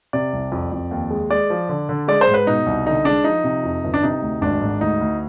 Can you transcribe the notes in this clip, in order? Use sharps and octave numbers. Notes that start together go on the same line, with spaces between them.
C3 D5
C2
F2
F2
D#2
G#3
G#3 D5
F3
D3
D3
G#3 D5
C5
G#2
B4
B2 D#4
C2
D3 D#4
G#3 D4
F3 D#4
C3
F2
G1
D4
C3 D#4
D2
G#1 D4
G#2
D2 D#4
D2